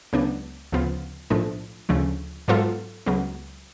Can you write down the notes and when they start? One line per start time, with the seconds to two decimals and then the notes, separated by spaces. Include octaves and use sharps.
0.13 C#2 C#3 F#3 B3 D4
0.72 D2 C#3 F3 B3 F4
1.30 B1 A2 F3 A3 D4
1.89 D2 C#3 F3 A3
2.48 G#2 F#3 B3 F4 A4
3.06 C#2 C#3 F#3 B3